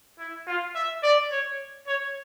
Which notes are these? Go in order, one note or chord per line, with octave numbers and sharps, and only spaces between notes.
E4
F4
E5
D5
C#5
C#5